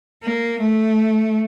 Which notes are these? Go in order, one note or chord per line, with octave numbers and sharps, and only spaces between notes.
A#3
A3